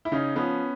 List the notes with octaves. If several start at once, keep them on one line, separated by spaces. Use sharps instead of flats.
E4
C#3 C#4 D#4
F3 B3 C#4